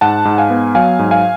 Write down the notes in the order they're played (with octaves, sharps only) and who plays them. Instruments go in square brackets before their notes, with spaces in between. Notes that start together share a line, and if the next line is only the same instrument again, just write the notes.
[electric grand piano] G#2 F#5 A5
G#2
F5 G#5
B3
F#3 F5 G#5
G#2
F5 G#5